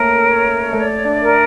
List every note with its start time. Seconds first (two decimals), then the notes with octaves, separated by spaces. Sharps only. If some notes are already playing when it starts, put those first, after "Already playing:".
Already playing: A3 A#3 C#4 A#4
0.25 C#5
0.73 A3 D5
1.05 D4
1.21 A#4